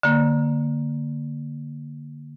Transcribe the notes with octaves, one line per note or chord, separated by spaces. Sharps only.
D3 A#3